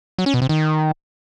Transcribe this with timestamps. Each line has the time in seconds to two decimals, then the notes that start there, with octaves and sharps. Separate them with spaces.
0.18 F#3
0.26 C#4
0.34 B2
0.42 C3
0.49 D#3